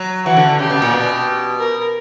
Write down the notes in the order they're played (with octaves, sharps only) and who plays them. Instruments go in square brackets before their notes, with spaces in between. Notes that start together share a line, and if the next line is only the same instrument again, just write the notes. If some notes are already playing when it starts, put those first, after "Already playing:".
Already playing: [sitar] F#3
[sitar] E3 [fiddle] F#4
[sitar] D3
D3
[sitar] C#3 [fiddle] G4
[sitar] B2
A#2
B2
[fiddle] A#4